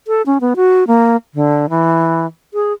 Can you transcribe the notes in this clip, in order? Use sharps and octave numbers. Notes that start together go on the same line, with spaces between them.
A4
C#4
B3
F#4
A#3
D3
E3
G#4